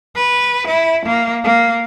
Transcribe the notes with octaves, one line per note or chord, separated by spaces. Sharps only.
B4
E4
A#3
A#3